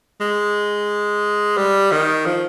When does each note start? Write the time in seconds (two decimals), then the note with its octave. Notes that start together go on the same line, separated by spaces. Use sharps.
0.21 G#3
1.57 G3
1.91 D#3
2.26 F3